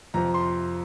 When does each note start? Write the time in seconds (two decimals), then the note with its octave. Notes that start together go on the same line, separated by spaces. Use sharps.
0.14 F2 C3 F3 A#5
0.34 C6